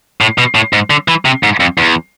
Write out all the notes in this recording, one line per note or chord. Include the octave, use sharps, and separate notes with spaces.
A2
B2
A2
G#2
D3
E3
C3
G#2
F2
E2